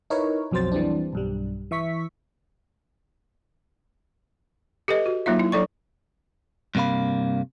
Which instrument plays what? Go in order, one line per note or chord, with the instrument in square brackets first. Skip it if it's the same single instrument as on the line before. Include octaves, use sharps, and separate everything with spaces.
[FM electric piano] D#4 E4 A#4 B4 C#5
B1 F2 F#3 C4 C5 A6
E3 G3 C4 D4
B1 G2 G3
E3 E5 C#6 B6
[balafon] G4 A4 B4 D#5
F#4
F#3 A#3 D#4 F4 E5
E4
F#3 D4 A4 D5 C#6
[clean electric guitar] G2 C3 A#3 F5 B5